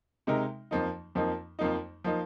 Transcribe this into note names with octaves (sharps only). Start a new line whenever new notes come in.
C3 G#3 D#4 A#4
F2 F3 A#3 D#4
F2 F3 A#3 D#4
F2 F3 A#3 D#4
F3 A#3 D#4